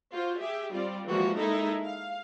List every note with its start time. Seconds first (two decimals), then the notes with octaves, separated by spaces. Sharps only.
0.11 F4 F#4 C5
0.40 G4 G#4 E5
0.72 G3 C4 F4 D5
1.06 E3 F3 G3 G#3 A#3 F#4
1.36 G#3 A#3 D#4 E4 A4 E5
1.84 F5